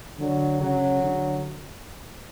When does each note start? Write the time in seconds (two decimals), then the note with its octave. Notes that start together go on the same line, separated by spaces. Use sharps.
0.20 D3 F#3
0.61 C#3 F#3
1.02 D3